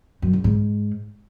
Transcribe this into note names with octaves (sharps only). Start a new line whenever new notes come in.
F#2
C#3
G#2